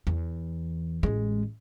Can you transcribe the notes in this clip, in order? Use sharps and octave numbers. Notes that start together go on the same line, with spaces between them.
E2
A1 G#3